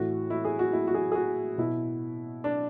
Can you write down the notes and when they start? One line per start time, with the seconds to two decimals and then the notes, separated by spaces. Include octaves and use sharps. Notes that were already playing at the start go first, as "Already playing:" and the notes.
Already playing: A2 E3 F#4
0.30 E4
0.45 G#4
0.59 F#4
0.73 E4
0.87 F#4
0.94 G#4
1.12 G#4
1.15 F#4
1.58 B2 E4
2.44 D4